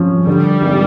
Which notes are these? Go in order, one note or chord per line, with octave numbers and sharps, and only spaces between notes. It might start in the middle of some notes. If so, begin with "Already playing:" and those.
Already playing: F3 C#4
D3 G3
G#1